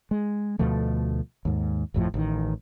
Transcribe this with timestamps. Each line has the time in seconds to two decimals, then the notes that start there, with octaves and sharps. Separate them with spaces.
0.11 G#3
0.59 D2 B2 F3 A3
1.45 D#2 G#2
1.94 G#1 F2 A2 F3
2.14 A1 D#3